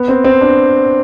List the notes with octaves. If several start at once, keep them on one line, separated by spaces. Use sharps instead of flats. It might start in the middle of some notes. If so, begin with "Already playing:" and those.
Already playing: B3
C4
C4
D4